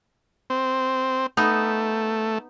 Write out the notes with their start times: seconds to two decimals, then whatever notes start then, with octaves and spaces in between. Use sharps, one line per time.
0.50 C4
1.37 A3 B3 D#4